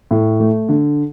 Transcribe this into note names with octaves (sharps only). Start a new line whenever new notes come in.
A2
A3
D3